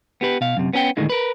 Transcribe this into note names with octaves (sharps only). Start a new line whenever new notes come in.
B3 G4 B4
B2 F5
F#2 C3
B3 C#4 G#4 G5
D2 A2 D3 D#3 G#3
A#4 B4